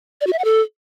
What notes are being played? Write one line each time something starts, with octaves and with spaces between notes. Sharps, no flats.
D5
F#4
E5
F#5
A4